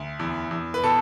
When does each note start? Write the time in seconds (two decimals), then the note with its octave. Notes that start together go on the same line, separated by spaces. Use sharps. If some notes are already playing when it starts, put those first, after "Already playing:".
Already playing: D2
0.19 E2
0.51 E2
0.74 B4
0.83 B2 A4